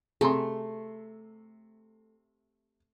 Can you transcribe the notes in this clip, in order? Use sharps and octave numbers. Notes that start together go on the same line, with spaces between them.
C3 A3 G#4 A5 A#5 C6